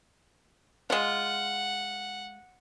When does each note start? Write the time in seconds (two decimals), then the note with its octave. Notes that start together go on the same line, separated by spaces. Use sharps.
0.90 G#3 F4 F#5